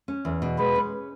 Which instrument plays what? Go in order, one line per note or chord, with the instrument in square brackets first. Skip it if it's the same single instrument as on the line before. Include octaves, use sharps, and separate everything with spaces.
[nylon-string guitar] C#4
E2
B2
[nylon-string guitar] G#3 [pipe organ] B4
[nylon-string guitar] C#4